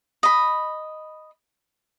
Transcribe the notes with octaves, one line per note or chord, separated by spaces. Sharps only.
D#5 B5